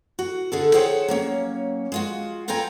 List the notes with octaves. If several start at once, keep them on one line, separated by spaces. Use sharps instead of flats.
F#4
D3 G#4 A4
G#4 A4 C5 C#5 F#5 G5
F#3 A#3 C#4
G#3 F4 F#4
B3 F4 A4 G5 G#5 A#5